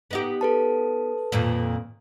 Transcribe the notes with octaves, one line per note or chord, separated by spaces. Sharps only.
B3 D#4 G4
A4 B4 A5
F2 A#2 D#3